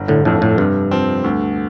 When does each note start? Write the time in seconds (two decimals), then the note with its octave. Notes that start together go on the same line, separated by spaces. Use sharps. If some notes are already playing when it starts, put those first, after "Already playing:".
Already playing: G1
0.08 A2 D3
0.25 F2 A2 D3 F3 A3
0.42 A2
0.58 G2 C3
0.91 F3 C4
1.24 D2